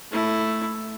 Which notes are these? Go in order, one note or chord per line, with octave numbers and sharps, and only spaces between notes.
A3 E4